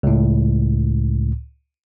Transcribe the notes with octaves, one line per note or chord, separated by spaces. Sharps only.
C#2 A2